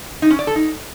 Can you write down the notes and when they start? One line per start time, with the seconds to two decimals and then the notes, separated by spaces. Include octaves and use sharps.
0.22 D#4
0.31 C#4
0.39 D5
0.47 A4
0.55 D#4